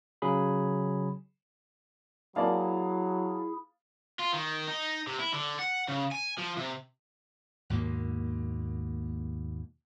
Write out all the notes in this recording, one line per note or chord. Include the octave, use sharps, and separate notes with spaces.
C#3 F#3 G#4 B5
F#3 A#3 E4 G#4 D5 F5 G#5 A5
F4
D#3
D#4
C3
E4
D3
F#5
C#3
G#5
F3
C3
D#2 G#2 B2 A#3